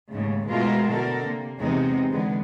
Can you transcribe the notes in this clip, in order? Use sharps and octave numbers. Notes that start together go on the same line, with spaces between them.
D#2 G#2 C#3 A3
B2 G#3 A3 E4 F4 A#4
B2 D3 A4 A#4
C3 A#3
E2 C3 G#3 B3 C4 D#4
E2 D3 G#3 B3